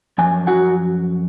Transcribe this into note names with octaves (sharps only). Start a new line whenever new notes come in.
F#2 F3 G#5
F#4 F#5